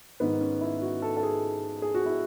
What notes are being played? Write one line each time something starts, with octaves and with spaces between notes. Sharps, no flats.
G#2 D#3 B3
C#4
E4
F#4
A4
A4
G#4
G#4
F#4
E4